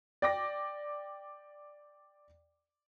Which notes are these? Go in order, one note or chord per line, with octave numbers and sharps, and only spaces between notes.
D5 G5 D6 A#6